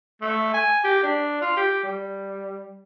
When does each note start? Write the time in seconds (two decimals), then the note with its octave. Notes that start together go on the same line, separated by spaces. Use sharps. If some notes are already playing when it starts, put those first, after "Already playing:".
0.21 A3
0.54 G#5
0.84 G4
1.03 D4
1.41 F4
1.57 G4
1.83 G3